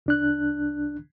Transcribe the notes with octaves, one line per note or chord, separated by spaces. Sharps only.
C2 D4 F#6